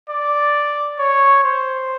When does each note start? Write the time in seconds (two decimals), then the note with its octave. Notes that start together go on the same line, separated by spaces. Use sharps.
0.09 D5
0.99 C#5
1.44 C5